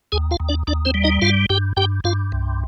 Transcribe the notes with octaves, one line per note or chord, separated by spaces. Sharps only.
D#2 G#4 G#5
F4 F5
D#2
D4 D5
D#2 D4 D5
C4 C5
G3
D#4 D#5
G2 F4 F5
G2 G4 G5
G2 G4 G5
G2 F4 F5
C2